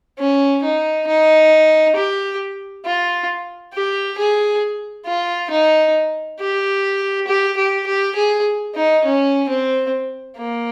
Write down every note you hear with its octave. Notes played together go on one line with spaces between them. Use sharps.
C#4
D#4
D#4
G4
F4
G4
G#4
F4
D#4
G4
G4
G4
G4
G#4
D#4
C#4
C4
A#3